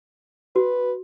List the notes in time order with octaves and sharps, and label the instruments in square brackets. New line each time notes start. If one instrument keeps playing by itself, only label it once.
[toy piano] F#4 [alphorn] B4